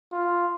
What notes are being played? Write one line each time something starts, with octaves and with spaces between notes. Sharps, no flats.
F4